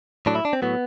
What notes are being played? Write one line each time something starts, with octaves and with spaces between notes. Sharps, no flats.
A2 F#3 D4
E4
D4
C4
A2 F#3 B3